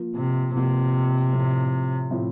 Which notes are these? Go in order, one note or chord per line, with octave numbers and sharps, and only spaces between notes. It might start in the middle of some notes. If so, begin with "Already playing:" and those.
Already playing: F3 A#3 F4 A#4
C3
C3 F3 A#3 F4 A#4
A2 F3 C4 E4
A2 F3 C4 E4